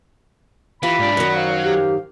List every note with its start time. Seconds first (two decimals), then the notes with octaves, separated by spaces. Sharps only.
0.83 E3 F4 G4 B5
0.99 G#2 D4 D5
1.17 F#2 D#3 F#3
1.35 C5 F5
1.64 G4